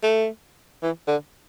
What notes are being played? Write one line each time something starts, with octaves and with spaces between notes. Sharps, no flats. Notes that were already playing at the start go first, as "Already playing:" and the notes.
A3
E3
D3